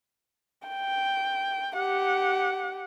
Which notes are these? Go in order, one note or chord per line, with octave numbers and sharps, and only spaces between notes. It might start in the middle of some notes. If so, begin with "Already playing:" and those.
G5
G4 F#5